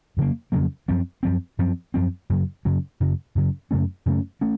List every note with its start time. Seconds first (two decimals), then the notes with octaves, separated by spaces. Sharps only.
0.17 F2 C#3 F#3 A#3
0.52 F2 C#3 F#3 A#3
0.88 F#2 F3 C4
1.23 F#2 F3 C4
1.59 F#2 F3 C4
1.94 F#2 F3 C4
2.30 F#2 C#3 F#3
2.65 F#2 C#3 F#3
3.00 F#2 C#3 F#3
3.35 F#2 C#3 F#3
3.71 F#2 C#3 A3 C#4
4.06 F#2 C#3 A3 C#4
4.41 A3 C#4